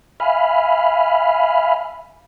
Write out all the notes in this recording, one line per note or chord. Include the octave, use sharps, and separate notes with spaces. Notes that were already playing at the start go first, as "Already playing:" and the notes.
E5 F5 G#5 B5 F6